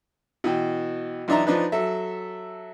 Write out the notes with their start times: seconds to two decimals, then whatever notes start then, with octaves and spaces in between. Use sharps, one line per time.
0.44 B2 E3 G5
1.28 B1 E3 D4 D#4 E5 A#5
1.47 F3 D4 D#4 B4
1.72 F#3 A4 E5